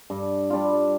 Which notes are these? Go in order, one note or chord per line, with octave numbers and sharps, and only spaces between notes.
G2
G3 D4 F4